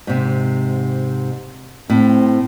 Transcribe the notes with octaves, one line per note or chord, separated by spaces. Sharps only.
G#2 C3
A2 C4